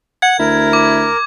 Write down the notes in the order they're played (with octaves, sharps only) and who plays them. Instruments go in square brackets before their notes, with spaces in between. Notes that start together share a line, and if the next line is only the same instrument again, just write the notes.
[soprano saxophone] F#5 [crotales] G#6
[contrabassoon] D2 [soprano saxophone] E4 [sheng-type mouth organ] A#4
[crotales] D6